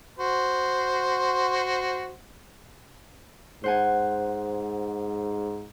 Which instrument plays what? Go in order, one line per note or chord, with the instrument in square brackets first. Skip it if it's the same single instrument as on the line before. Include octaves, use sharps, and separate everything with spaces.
[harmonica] F#4 C5
[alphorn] G#2 [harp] C5 F#5 G#5